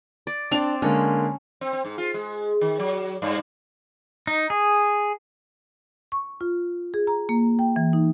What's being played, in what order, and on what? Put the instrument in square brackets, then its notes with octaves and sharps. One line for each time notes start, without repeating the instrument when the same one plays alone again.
[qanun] D5
[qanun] C4 D5 [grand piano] D4 F7
[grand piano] D3 G#3 A#3 [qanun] C#4
[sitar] C4
C4
G#2
F4
G#3
D#3
F#3
G2
[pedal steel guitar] D#4
G#4
[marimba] C#6
F4
G#4
A#5
A#3
G5
E3
D#4